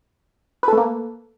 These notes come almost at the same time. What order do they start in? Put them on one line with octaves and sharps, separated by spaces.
B4 A4 A3 A#3